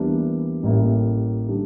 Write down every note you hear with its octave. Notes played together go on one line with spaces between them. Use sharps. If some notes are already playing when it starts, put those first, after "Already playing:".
Already playing: E2 E3 G3 A#3 D4
A1 A2 G3 A#3 E4
D3 G3 D4